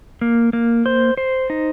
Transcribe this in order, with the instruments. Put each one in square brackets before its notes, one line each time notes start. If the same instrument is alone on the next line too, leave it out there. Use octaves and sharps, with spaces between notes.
[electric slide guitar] A#3
A#3
C5
C5
D#4